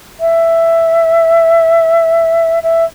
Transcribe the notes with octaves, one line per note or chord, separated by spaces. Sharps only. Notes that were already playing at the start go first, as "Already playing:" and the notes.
E5
E5